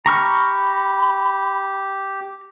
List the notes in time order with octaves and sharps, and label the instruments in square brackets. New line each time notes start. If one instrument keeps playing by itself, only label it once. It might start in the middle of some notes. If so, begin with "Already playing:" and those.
[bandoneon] G4 [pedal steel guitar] A#5 C#6 F6 [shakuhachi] B5